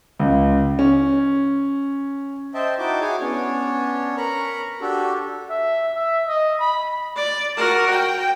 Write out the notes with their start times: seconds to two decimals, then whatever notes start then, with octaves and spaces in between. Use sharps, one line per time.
0.19 C#2
0.79 C#4
2.54 C5 D#5 E5 G5 A5
2.78 D#4 E4 F#4 G5 A5 D6
3.01 E4 F#4 G#4 C#5 G#5 D6
3.20 B3 C#4 D4 C#5
4.17 A#4 A#5 B5 C#6
4.81 D4 F#4 G4 A4
5.50 E5
5.95 E5
6.27 D#5
6.60 B5
7.16 D5
7.57 F#4 A#4
7.90 G5